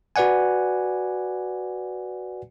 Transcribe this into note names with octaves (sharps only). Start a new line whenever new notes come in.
F#4 B4 D5 F#5 G#5